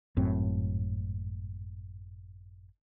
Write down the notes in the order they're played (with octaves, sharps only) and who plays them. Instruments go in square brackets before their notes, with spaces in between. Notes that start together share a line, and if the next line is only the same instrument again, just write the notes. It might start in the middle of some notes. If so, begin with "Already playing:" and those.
[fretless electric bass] G#1 F#2 A2 C4